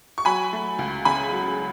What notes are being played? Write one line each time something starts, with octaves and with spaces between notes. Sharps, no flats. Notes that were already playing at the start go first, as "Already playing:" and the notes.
C#6
F#3 G#5 B5
A3
C#2
C#3 G#5 B5
F#3